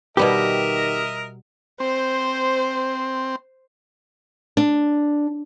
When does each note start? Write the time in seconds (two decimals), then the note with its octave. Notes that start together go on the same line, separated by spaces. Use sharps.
0.17 B2 D#3 G3 B3 G4 A#4 D#5 E5
1.80 C4 C5
4.57 D4